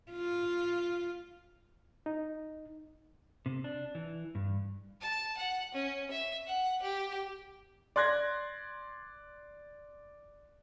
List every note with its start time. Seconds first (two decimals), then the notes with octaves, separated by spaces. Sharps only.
0.12 F4
2.06 D#4
3.46 C3
3.64 D4
3.95 E3
4.35 G2
5.01 A5
5.37 F#5
5.74 C#4
6.11 E5
6.47 F#5
6.83 G4
7.96 D5 C6 F#6 G#6 A#6